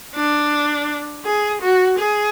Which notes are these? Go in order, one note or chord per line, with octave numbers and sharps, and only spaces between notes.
D4
G#4
F#4
G#4